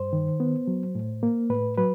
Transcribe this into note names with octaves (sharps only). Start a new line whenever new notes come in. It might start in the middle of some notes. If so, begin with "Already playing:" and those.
Already playing: G2 C5
D#3
B3
F#3
A2
A#3
A2 B4
F#3 B4